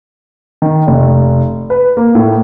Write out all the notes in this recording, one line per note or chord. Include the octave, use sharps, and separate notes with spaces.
D#3
F1
B4
A#3
A2